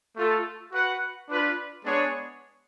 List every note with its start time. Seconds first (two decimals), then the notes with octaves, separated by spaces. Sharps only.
0.16 A3 F4 A4
0.72 F#4 B4 F#5
1.28 D4 F4 B4
1.84 G#3 B3 D4 G#4 C#5